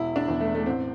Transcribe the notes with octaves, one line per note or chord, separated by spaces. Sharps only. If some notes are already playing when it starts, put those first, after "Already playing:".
Already playing: E1 E4
D4
E2 E3
A3
A3
A1 C4